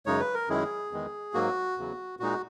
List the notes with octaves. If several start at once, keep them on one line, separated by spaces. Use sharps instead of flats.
F#2 C#3 G#3 D#4 C#5
B4
A#4
F#2 D#3 G#3 C#4 E4 G#4
E2 D#3 G#3
G#2 F#3 A#3 F#4
E2 C#3 F#3
A#2 G#3 D#4 F#4